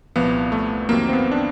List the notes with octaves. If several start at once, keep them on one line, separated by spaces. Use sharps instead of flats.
C2 A#2 F3 B3
A3
F2 C3 D#3 F#3 A#3
C4
B3
D4